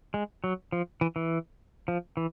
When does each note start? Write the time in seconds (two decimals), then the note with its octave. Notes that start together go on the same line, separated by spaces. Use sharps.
0.14 G#3
0.44 F#3
0.72 F3
1.01 E3
1.16 E3
1.88 F3
2.17 E3